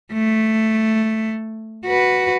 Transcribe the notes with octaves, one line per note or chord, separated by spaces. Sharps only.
A3
F#4 B4